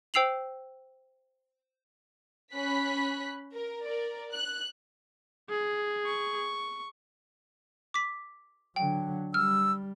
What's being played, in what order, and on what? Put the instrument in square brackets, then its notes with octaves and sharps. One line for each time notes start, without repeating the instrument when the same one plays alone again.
[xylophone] C5 G5 E6 C7 F7 F#7
[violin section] C#4 B5 F#6 B6
A#4
A#4 D5
F#6
[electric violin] G#4
[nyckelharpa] C#6
[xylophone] D6 B6
[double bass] D3 F#3 [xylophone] G5
[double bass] G3 [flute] E6 [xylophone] F6